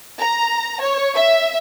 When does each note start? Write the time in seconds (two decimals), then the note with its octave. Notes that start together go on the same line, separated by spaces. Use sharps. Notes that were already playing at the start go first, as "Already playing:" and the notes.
0.20 A#5
0.82 C#5
1.15 E5